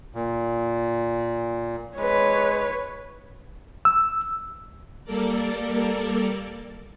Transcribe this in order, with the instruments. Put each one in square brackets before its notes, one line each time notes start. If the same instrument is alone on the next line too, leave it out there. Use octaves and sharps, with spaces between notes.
[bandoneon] A#2
[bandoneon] G#3 [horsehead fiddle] B4 C#5
[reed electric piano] E6
[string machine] G3 A#3 A4 A#4 D5